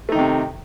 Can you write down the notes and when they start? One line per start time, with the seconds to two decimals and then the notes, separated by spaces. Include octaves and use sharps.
0.09 A3
0.12 D#4
0.15 D#3
0.19 C3